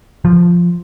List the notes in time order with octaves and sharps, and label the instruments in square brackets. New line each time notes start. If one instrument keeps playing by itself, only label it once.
[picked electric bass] F3